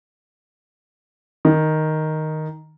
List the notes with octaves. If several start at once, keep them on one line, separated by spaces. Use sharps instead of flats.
D#3